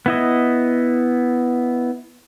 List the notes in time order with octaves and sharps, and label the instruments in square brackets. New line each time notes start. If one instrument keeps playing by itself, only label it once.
[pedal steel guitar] B3 E4 D#5